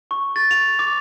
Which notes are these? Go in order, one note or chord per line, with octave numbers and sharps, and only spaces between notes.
C#6
A6
F7
D6